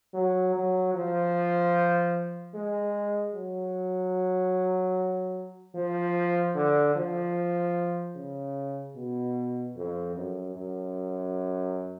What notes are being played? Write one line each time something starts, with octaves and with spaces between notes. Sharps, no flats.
F#3
F#3
F3
G#3
F#3
F3
D3
F3
C#3
B2
F2
F#2
F#2